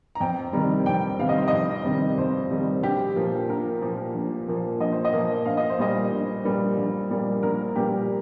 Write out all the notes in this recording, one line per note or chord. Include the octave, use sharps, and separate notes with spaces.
A#5
F2 G5
C3 D#3 G3 A#5
F2 G5
C3 D#3 G3 F5
D#5
C5
F2 D#5
C3 D#3 G3
F2 C5
C3 D#3 G3
A#1 G4
A#2 F3 A#3
A#1 A#4
A#2 F3 A#3
A#1
A#2 F3 A#3
A#1 D#5
C5
D#5
A#2 F3 A#3
A#1 F5
D#5
C5
A#2 G3 A#3 D#5
A#1
A#2 G3 A#3
A#1
A#2 G3 A#3
A#1 A#4
A#2 G3 A#3 G4